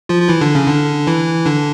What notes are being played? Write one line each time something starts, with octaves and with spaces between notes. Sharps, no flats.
F3 F4
F4
E3 E4
D3 D4
C#3 C#4
D3 D4
E3 E4
D3 D4